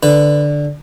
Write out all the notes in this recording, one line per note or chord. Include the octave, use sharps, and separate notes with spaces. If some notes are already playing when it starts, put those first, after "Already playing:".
D3 B4